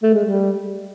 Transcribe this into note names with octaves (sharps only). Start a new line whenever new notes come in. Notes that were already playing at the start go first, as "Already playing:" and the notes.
A3
G#3
G3